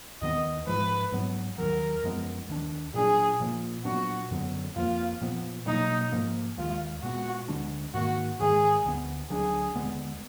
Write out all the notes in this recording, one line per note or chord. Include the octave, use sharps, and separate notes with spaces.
D#2 D#3 G#3 B3 D#5
G#2 F3 G#3 B4
G#2 F#3 B3
D#2 D#3 F#3 A#4
F#2 F3 G#3 B3
D#2 D#3 A#3 D4
A#2 F#3 D4 G#4
A#2 F3 A#3
A#2 F#3 B3 D4 F#4
F#2 D3 F#3 B3
F2 F3 A#3 F4
A#2 F3 B3
B2 F#3 A#3 D#4
G#2 F3 A#3
D#2 D#3 G#3 F4
A#2 G#3 B3 F#4
D2 D3 G#3 D4
G#2 D#3 A#3 F#4
G#2 D#3 G#3 G#4
D2 D3 F3 B3
D2 D3 F#3 D4 G#4
D#2 D3 G#3 B3